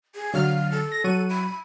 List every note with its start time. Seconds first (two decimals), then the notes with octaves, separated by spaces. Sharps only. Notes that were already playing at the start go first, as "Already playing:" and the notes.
0.15 G#4
0.34 D3 F#3 F5 F6
0.72 A4
0.92 A#6
1.04 F#3 C#6 F#6 D#7
1.30 B5